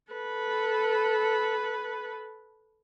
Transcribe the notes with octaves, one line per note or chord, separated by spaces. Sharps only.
A4 B4